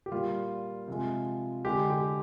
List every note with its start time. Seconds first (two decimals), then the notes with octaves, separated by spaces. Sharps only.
0.06 G4
0.12 A#2 G3 F4
0.88 C3 F3 G#3
1.65 D3 G#3 G4
1.90 G4